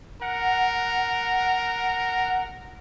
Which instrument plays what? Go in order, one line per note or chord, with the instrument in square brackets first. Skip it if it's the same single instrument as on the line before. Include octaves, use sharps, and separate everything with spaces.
[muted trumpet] A#4 [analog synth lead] F#5